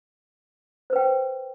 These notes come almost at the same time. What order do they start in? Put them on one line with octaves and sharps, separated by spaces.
C5 B4 G5